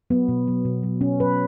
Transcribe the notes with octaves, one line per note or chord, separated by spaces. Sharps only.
F#3 B3
B2
F#3
B2
F#3
B2 C#4
F#3 B4